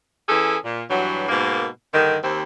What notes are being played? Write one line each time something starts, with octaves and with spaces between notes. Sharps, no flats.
E3 C#4 G#4 A4
A#2
G2 E3 F#3
G#2 B2 A#3
G2 D3 D#3
D#2 C4